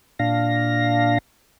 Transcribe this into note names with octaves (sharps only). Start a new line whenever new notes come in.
A#2 D4 F5 A#6